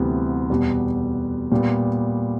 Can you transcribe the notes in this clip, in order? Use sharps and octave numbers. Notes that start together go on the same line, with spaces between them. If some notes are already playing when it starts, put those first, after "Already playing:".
Already playing: D2 C3 E3 G3 B3
E2 B2 G3
A#2 G3 B3